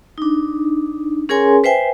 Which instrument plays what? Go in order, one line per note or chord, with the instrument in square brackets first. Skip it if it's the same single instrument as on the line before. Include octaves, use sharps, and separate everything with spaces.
[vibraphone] D4 D#4
C#4 G#4 A#4 C#5 G#5 C6
B4 C5 E5 G5 G#5